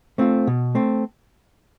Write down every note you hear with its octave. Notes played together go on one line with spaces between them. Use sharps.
A3 C4 F4
B2
A3 C4